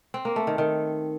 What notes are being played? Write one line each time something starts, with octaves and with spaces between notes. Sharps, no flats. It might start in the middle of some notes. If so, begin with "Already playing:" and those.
C4
A#3
A3
D#3
D#3